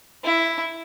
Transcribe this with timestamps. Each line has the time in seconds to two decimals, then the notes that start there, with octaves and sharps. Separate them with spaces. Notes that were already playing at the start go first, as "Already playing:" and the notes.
0.24 E4